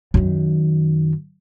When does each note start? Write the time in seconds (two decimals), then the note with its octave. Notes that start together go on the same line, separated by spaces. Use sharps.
0.14 F#2 D#3